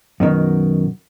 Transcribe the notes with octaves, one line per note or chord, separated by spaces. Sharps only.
F#2 B2 D#3